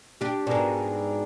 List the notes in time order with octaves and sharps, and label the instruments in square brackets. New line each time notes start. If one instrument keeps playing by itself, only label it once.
[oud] D4 G4 [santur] G5 A5
[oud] G#2 B2 [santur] D4 G#4 A#4